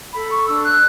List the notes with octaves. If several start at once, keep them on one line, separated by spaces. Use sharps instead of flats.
A4 B5
C#6
D4 E6
F#6